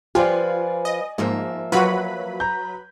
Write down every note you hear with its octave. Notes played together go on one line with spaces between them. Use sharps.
F3 F4 G4 B4 D5 G#5
D#5
G#2 F3 A#3 E5
F#3 F4 F#4 B4 B5
A#5 G6